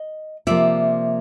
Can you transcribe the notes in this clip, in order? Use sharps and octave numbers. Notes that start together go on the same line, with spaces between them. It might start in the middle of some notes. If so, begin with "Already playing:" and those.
Already playing: D#5
C3 F3 A#3 D5 E5